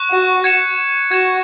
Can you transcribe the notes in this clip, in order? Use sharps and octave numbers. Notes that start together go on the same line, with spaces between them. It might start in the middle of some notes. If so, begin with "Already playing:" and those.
Already playing: C#6 F#6 E7
F#4
G#6 C#7 E7
F#4 G#6 E7